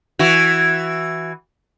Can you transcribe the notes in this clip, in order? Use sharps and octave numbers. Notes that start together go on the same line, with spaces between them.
E3 F#4